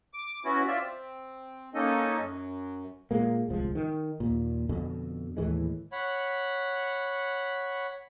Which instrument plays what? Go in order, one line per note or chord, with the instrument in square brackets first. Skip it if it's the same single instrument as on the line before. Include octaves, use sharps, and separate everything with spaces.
[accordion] D6
B3 C#4 E4 F#4
F4 D5 E5
C4
A#3 C#4 D#4 A4 D#5
F#2
[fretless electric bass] A#2 G#3 A#3
D1 C2 F3 G#3
D#3
D#2 A#2
F2 B2 D3
D#2 A2 E3 G#3
[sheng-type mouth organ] C#5 F#5 B5